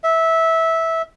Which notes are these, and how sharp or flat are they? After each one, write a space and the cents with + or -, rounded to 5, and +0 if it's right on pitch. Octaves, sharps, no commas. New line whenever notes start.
E5 -15